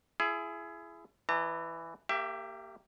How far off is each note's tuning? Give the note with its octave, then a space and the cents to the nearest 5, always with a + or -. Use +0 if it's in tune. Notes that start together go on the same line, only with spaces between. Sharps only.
E4 +30 G#4 +15
E3 +5 D#5 -45 A#5 -45
A#3 -25 G4 +0 E5 +25